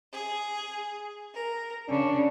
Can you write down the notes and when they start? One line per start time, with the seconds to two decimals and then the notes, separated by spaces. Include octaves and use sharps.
0.13 G#4
1.35 A#4
1.88 C#3 D4